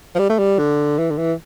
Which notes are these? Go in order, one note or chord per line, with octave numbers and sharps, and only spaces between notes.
F3
G3
A3
G3
D3
E3
D3
E3